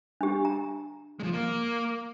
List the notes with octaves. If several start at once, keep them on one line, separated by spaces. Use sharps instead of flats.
D4 G4
A#5
F3 G#3
A#3